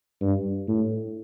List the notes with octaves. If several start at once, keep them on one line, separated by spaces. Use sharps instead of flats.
G2
A2